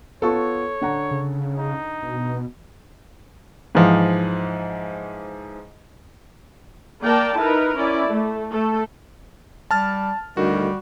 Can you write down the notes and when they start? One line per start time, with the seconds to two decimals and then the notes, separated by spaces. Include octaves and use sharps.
0.22 B3 F4 A4 C#5 C#6
0.81 D3 F#5 A#5
1.11 C#3
1.59 D#4
2.03 B2
3.75 G#2 E3 F3
7.01 A#3 A#4 D5 G5 A5
7.38 D#4 E4 A#4 B4
7.76 C#4 E4 D5
8.09 A3
8.51 A3 A4
9.71 G3 A5 F6 A6
10.37 D2 D#3 G3 F#4